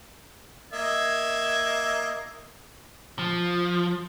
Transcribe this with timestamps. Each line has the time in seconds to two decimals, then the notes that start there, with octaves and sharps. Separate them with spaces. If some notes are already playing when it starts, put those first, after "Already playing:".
0.73 A#3 D#5 E5 G#6
3.19 F3